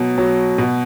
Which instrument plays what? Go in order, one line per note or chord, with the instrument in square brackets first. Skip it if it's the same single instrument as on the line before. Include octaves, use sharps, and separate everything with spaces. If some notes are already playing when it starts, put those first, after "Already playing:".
Already playing: [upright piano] B2 F#3
F#3
B2